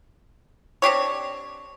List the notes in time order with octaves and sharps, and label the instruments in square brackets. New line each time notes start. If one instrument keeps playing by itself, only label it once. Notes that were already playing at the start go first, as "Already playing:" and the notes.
[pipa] C4 D4 G4 C#5